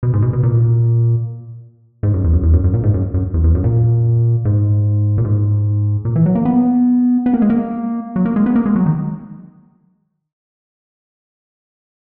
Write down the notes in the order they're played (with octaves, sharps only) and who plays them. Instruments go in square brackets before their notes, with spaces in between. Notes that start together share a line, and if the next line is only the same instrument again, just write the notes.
[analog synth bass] B2
G#2
B2
B2
A#2
G#2
F#2
E2
F#2
E2
F#2
F#2
A#2
G#2
F#2
F#2
E2
E2
F#2
A#2
G#2
A#2
G#2
A#2
E3
F#3
A#3
B3
B3
A#3
G#3
A#3
F#3
A#3
G#3
B3
A#3
G#3
F#3
D#3